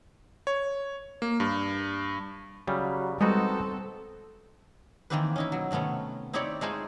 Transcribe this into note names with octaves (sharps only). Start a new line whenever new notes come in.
C#5
A#3
G2
C#3 F#3 G3
G3 G#3 B3 C4 D#4 F#4 A4
D#3 E3 A#3 C4 G4 B4
C#4 D#4 E4
B2 F#3
C3 D#3 A3 B3 C#4
C4 D#4 E4 G4 C#5 D5
G#3 A3 D#4 F4 G#4 C5